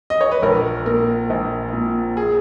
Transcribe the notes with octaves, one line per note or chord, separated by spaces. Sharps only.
D#5
C#5
B4
A#1 A#4
A#2 A#4
A#1
A#2
G#4